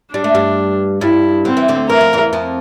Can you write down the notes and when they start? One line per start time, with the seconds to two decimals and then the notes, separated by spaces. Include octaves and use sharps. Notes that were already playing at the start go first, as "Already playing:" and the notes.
0.14 G3 D4
0.24 A3
0.35 G2 G3
1.01 G2 G3 E4
1.45 D3 C4
1.57 E3
1.68 D2 D3
1.89 E3 A#4
2.01 F3
2.13 E2 E3
2.33 F2 F3